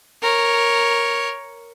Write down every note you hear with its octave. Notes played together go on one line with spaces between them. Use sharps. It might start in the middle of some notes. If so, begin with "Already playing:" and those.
A#4 C#5